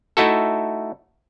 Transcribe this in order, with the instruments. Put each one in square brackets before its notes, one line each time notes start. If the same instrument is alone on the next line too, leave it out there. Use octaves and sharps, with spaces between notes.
[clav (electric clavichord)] A3 D#4 E4 F#4 A4